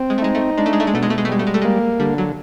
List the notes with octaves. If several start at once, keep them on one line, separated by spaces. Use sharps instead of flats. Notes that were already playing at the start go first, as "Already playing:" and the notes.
Already playing: C4
G#3
A3
G#3 D#4
A3
G#3 D4
A3
G#3
A3
G#3
B2 A3
G#3
A3
G#3
A3
G3 G#3
A3
G#3
A3
G#3 A#3
D3 G3
F#3